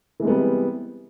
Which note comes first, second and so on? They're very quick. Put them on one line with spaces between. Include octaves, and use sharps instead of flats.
E3 G#3 C3 B3 G3